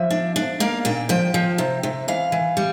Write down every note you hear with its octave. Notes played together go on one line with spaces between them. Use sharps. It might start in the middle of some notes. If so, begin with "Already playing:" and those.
Already playing: F3 E5
D4
D4
A#3 F5
A#2 G5
F3 G5
F3
C3
C3
E3 F5
E3
G3